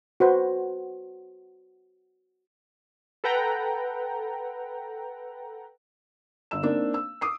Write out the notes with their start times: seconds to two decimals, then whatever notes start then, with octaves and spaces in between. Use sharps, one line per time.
0.20 F#4 B4 C5
3.24 A4 B4 F#5 G5 A#5
6.51 G1 E6 E7
6.63 A#3 C4 D4 D#4
6.94 E6
7.21 D6 D#6 C7